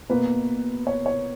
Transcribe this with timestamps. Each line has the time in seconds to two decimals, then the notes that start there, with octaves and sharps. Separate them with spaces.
0.09 B2 A#3 B4
0.87 C#5
1.06 C#5